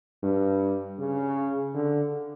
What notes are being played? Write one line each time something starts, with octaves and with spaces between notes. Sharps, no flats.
G2
C#3
D3